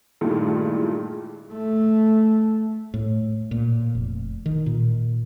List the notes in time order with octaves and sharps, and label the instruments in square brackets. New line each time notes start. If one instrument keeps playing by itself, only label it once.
[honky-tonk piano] G2 A#2 D#3 E3 G#3 A3
[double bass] A3
[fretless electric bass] A2
A#2
F1
D#3
A#2